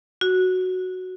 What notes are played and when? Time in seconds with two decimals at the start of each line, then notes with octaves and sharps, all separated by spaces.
0.21 F#4